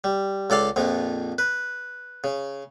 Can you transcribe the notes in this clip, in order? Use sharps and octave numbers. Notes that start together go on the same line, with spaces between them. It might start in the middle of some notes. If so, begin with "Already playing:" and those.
G3
C#2 A4 D5 F5
A#1 F2 F3
B4
C#3